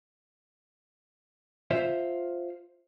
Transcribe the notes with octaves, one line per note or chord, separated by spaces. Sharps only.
F4 C5 E5